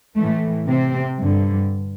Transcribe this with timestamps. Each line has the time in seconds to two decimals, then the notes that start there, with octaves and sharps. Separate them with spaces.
0.16 A2 E3 A3
0.67 C3 C4
1.19 G2 D3